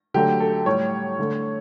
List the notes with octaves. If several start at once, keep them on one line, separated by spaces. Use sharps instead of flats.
D3 F#3 A3 G4
A4
A2 G3 C#5
D3 A3